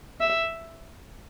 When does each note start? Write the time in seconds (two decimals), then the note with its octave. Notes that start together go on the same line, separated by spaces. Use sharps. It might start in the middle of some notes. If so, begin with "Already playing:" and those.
0.20 E5